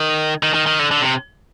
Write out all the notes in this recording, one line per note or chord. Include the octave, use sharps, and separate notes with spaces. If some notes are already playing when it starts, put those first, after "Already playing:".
Already playing: D#3
D#3
D#3
D#3
D3
D3
C3